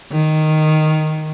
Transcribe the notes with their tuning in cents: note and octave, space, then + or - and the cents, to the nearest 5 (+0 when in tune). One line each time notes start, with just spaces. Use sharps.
D#3 -5